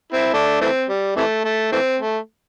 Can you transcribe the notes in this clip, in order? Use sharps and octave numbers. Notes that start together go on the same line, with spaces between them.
C4 E4
A3 D4
E3 A3 C4
G3
C3 E3 A3
A3
E3 A3 C4
A3